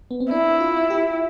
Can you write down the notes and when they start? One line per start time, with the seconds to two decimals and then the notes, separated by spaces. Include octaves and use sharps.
0.11 B3
0.20 C4
0.31 D4 E4
0.60 F4
0.90 G4